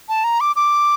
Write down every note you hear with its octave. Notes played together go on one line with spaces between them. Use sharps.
A5
A#5
D6
D6